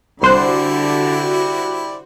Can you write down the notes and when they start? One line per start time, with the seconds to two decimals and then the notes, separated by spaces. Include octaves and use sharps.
0.22 C2 D3 E4 F#4 G4 C5 D5 F#6